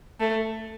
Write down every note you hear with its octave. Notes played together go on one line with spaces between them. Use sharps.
A3